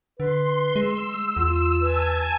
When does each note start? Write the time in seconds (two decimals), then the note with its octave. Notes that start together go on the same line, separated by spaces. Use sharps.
0.20 D3 B4 C6
0.76 G#3 E6
1.37 E2 F4
1.82 B4 G#5 A5